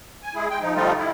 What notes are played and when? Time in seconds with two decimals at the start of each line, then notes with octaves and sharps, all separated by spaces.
0.23 G#5
0.35 G#3 E4 G#4
0.50 G#3 G5
0.61 F3 D#4
0.75 D3 F3 G3 A3 D#4 F4
0.98 E4